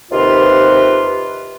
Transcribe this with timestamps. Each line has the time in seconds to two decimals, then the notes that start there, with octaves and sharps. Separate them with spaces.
0.12 D#2 C3 F4 B4